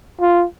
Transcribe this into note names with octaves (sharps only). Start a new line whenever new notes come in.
F4